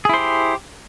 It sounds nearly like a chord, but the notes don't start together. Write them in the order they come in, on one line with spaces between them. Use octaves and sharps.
G#4 E4 C5 G4